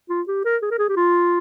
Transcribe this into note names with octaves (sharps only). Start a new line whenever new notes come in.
F4
G4
A#4
G#4
A#4
G#4
G4
F4